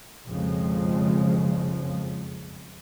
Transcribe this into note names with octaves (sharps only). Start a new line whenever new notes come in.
F#1 B1 F2 C#3 F3 G#3